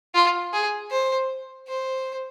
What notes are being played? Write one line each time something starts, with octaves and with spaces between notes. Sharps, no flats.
F4
G#4
C5
C5